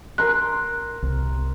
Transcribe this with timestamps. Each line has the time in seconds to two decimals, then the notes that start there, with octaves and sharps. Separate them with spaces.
0.18 A#4 C6 F#6
1.02 C2